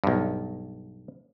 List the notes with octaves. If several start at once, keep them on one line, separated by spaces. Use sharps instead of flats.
B1 G2